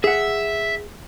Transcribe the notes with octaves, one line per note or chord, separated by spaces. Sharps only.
G#4 E5 F#5